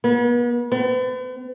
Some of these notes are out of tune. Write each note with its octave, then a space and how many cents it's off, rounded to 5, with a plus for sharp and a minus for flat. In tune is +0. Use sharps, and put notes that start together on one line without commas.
B3 -40
B3 +45